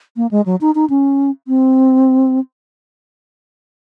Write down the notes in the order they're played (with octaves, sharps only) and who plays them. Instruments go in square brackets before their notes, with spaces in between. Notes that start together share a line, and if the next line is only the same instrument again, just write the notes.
[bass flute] A#3
G#3
F#3
D#4
D#4
C#4
C4